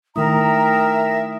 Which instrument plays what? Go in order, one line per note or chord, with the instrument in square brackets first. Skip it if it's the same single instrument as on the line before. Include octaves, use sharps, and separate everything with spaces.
[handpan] D#3 A3 E4 [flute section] A#4 A#5 [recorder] E5 [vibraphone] G5 D#6